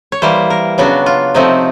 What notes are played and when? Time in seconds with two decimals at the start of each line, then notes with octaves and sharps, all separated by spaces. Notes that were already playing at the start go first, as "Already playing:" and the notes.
0.12 C#5
0.22 E3 G3 A#3 C5
0.50 A#4
0.78 C#3 F#3 B3 D4 F#4
1.06 F4
1.34 C3 F3 A3 C4 D#4